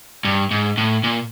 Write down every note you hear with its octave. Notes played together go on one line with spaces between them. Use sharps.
G2
G#2
A2
A#2